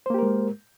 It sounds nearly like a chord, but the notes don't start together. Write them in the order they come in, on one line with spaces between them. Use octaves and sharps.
C5 A#3 G4 A#4 G#3